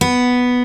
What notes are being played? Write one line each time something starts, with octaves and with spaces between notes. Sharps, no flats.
B3